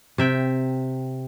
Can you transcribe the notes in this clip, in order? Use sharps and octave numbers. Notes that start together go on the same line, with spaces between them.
C3 E5 G5